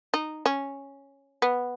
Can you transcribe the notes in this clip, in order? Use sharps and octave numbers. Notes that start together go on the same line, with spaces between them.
D#4
C#4
B3